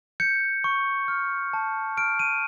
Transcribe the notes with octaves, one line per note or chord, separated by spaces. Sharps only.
G6 C#7
C#6
F6
A5
F6 D7
D#7